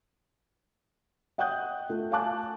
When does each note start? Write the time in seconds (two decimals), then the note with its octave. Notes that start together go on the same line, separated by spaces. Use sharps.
1.38 D#5 F#5 G5 D#6 F#6 G6
1.89 A3 F4
2.12 F5 G#5 A5 D6 F#6